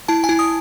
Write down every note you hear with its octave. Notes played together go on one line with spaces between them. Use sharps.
E4 A5
G#5
E4
D#6